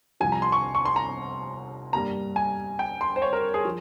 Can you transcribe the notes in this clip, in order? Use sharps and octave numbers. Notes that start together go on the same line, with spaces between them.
C2 C3 F3 G#5
A#5
C6
C#6
C#6
C6
A#5
G2 G3 A#3 A#5
G#5
G5
C6
C5
C#5
A#4
G#4
F3